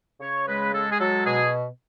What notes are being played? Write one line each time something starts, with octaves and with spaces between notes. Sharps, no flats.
C#3 C#5
G#3 B4
G#3 A4
G#4
F#3 A4
B2 G#4